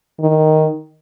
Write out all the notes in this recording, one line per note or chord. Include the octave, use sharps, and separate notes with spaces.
D#3